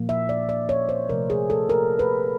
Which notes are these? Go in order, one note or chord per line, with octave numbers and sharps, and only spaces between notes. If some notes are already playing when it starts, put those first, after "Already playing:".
Already playing: A#2 F3 A#3
E5
D5
D5
C#5
C5
C3 F3 A3 A#4
G#4
A4
A#4
B4